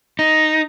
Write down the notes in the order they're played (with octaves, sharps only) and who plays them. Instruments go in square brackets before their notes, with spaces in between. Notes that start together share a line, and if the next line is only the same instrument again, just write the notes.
[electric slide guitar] D#4